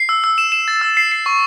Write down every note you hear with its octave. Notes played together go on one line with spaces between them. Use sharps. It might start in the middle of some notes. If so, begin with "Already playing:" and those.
Already playing: C7
E6
E6
E7
E7
A6
E6
C7
C7
C#6